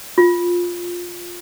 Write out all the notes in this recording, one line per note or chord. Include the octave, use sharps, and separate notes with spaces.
F4